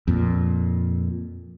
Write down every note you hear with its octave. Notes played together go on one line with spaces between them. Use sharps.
F2 A#2